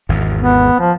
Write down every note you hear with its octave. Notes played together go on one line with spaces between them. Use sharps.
G#1 E2
B3
F3